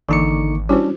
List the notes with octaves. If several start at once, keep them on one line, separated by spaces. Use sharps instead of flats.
G#1 D3 E3 A#3 D#4 C#6 D6 C#7
G3 C#4 D4 E4 F#4 C5